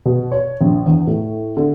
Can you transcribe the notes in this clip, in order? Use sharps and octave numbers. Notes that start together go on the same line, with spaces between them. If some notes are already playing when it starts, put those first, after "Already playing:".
B2
C#5
A#1
E2
A2
D3